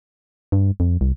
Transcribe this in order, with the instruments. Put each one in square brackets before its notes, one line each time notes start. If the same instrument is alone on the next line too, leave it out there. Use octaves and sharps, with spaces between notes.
[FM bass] G2
F2
C2